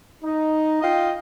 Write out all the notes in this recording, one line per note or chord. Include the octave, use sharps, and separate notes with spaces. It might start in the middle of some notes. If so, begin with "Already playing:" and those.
D#4
F4 D#5 F5 G5